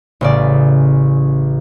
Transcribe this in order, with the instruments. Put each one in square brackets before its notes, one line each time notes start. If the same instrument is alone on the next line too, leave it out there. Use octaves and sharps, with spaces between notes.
[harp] A1 C#3 D5